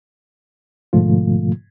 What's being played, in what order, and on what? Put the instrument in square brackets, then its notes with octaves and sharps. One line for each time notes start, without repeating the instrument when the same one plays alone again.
[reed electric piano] G#2 B2 D3 F3 A3 F4